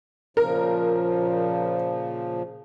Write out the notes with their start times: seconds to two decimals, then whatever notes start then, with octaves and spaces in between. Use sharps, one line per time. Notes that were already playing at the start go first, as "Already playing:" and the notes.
0.37 A#2 C#3 F3 A#4